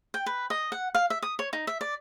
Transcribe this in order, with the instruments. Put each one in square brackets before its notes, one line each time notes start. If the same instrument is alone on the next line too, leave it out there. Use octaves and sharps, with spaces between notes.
[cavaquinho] G5
B4
D#5
F#5
F5
E5
D#6
C#5
D#4
E5
D5